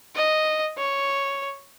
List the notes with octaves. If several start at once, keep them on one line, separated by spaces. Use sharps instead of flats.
D#5
C#5